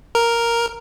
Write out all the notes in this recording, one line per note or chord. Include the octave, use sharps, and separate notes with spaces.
A#4